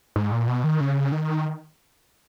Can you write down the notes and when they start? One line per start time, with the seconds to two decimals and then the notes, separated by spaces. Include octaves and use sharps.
0.16 G#2
0.32 A#2
0.48 B2
0.64 D#3
0.80 C#3
1.12 D#3